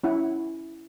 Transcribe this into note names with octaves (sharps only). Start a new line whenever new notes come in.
C#4 E4 F#5